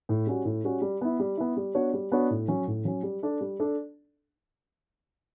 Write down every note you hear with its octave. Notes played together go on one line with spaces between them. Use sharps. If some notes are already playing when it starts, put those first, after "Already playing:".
A2
G3 C#4 F#4
A2
G3 C#4 F#4
G3
B3 E4
G3
B3 E4
G3
B3 D4 F#4 C#5
G3
B3 D4 F#4 C#5
A2
F#3 C#4
A2
F#3 C#4
G3
D4 A4 D5
G3
D4 A4 D5